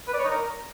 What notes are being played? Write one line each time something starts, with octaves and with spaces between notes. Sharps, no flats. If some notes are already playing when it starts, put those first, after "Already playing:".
B4
D5
C#5
D#4
A#4